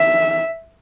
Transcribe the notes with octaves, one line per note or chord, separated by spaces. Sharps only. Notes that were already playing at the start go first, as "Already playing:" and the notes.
Already playing: E5